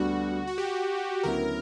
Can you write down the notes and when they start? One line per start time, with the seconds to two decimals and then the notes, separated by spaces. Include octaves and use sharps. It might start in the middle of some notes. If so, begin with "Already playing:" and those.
Already playing: D2 D3 G3 B3 F#4
0.47 F#4
0.58 G4
1.23 D2 C#3 F#3 B3 E4 A#4